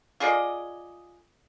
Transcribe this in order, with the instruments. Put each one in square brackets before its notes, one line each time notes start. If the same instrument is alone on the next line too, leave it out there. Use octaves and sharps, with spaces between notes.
[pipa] F4 G#4 D5 D#5